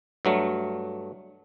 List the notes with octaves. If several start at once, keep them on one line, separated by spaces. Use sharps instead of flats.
G2 F#3 A3